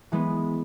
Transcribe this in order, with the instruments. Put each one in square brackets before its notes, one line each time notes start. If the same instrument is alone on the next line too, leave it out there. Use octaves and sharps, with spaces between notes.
[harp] E3 G#3 B3